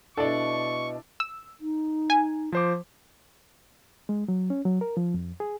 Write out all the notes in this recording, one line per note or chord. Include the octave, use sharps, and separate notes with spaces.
B2 D4 E4 A4 D5 C#6
E6
D#4
G#5
F3 C5 D6
G#3
F#3
C#4
F#3
A#4
F3
F2
G#4